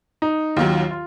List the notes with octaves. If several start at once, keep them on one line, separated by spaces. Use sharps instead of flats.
D#4
D#2 D#3 F#3 F4
F4